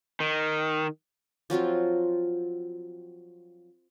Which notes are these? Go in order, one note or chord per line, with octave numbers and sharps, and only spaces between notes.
D#3
F3 F#3 C4 F4